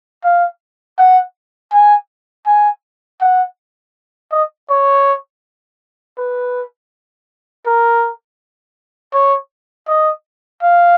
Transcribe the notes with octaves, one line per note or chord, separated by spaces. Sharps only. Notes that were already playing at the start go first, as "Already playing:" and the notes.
F5
F#5
G#5
G#5
F#5
D#5
C#5
B4
A#4
C#5
D#5
F5